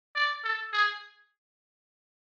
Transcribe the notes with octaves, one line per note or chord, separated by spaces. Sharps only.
D5
A4
G#4